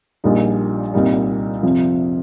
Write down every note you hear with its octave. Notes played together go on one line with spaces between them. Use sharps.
A#1 A#2 G3 D#4
C2 A#2 G3 D#4
F2 C3 F3